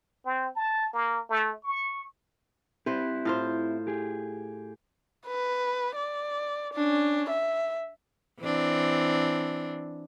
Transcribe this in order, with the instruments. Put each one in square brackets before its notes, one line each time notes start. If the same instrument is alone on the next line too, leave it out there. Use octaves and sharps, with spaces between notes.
[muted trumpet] C4
A5
A#3
A3
C#6
[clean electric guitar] C4 E4 G4 [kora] B4 C5
[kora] A2 F4 C5
[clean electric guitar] G4 G#4
[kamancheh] B4
D5
C#4 D4
E5
[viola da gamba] E3 C4 D4